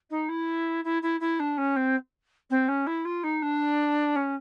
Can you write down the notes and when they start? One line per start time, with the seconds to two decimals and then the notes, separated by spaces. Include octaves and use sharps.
0.10 D#4
0.28 E4
0.84 E4
1.02 E4
1.20 E4
1.39 D4
1.57 C#4
1.76 C4
2.50 C4
2.68 C#4
2.86 E4
3.05 F4
3.23 D#4
3.42 D4
4.15 C#4